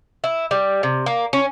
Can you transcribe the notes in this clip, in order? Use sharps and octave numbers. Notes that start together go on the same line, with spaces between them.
E4
G3
C3
A#3
C#4